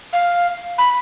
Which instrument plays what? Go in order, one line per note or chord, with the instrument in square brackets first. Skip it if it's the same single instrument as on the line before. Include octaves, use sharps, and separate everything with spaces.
[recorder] F5
B5